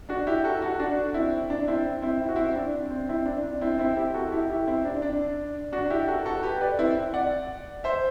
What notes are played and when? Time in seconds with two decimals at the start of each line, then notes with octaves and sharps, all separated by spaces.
0.09 D4 F#4
0.27 E4 G4
0.44 F#4 A4
0.61 F#4 A4
0.80 D4 F#4
1.14 C4 E4
1.50 D4
1.68 C4 E4
2.02 C4 E4
2.21 E4
2.29 F#4
2.36 C4 E4
2.56 D4
2.91 C4
3.09 C4 E4
3.26 D4
3.43 D4
3.61 C4 E4
3.79 C4 E4
3.97 E4 G4
4.14 F#4 A4
4.32 E4 G4
4.49 E4 G4
4.67 C4 E4
4.85 D4
5.02 D4
5.72 D4 F#4
5.90 E4 G4
6.08 F#4 A4
6.25 F#4 A4
6.43 G4 B4
6.61 B4 D5
6.79 C4 E4
7.14 D5 F#5
7.84 C5 E5